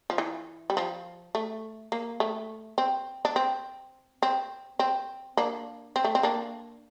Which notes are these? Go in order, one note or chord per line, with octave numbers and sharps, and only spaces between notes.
F3
E3
G3
F3
A3
A#3
A3
C4
D4
C4
C4
C4
A#3 D4
C4
A3
C4
A#3 D4